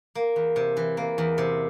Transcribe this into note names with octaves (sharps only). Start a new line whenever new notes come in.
A#3
E2
C3
E3
A#3
E2
C3